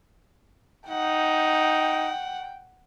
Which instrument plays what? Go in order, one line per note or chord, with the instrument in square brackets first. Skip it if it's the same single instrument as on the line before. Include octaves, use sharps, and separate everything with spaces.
[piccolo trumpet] D#4 [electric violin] F#5 [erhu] G5